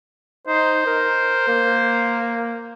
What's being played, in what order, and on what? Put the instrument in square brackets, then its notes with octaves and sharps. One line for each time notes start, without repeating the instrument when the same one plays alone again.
[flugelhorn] D#4 [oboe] C5
[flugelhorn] A#4
A#3